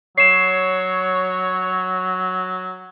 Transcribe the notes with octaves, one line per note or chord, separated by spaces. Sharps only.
F#3 C#5 C7 E7